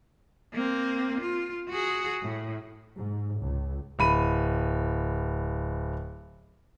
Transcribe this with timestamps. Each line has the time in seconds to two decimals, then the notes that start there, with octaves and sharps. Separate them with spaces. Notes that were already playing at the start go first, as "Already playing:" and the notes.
0.53 A#3 C4
1.20 F4
1.69 F#4 G#4
2.22 A2
2.96 G#2
3.41 C#2
3.99 D1 B5 D#7